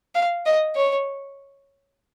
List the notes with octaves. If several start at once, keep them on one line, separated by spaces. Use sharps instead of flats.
F5
D#5
C#5